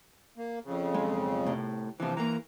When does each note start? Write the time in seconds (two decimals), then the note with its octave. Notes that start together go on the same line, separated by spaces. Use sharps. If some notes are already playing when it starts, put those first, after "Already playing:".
0.38 A#3
0.65 F2 C#3
0.94 B1 G#3
1.47 A2 C3
2.00 C3 E3 F3
2.17 E3 A#3 A#5